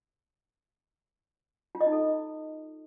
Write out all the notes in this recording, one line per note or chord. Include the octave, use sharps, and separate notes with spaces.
F4
D#5
D#4
A4